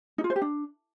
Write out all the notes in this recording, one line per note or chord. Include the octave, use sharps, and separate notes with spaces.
D#4
F4
C5
G4
D4